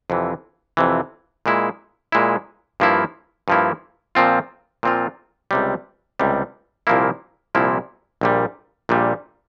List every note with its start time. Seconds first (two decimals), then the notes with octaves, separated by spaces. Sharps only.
0.10 F2 C3 E3
0.77 F2 C3 E3
1.46 A#2 G#3 E4
2.12 A#2 G#3 E4
2.80 G2 F3 A#3 E4
3.48 G2 F3 A#3 E4
4.15 A#2 F3 C4 F4
4.83 A#2 F3 C4 F4
5.51 C#2 C3 G3
6.20 C#2 C3 G3
6.87 C2 A#2 F3 A#3 E4
7.55 C2 A#2 F3 A#3 E4
8.21 A#1 A#2 G3
8.89 A#1 A#2 G3